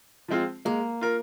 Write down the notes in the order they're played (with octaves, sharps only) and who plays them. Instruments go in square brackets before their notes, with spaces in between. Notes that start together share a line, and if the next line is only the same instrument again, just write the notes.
[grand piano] F3 G#3 C4 F4
[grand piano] G#3 [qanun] A#3
[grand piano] F4 A#4